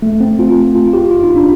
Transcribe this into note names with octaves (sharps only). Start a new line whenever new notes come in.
A3
C4
F4
F4
G4
F4
D#4
D4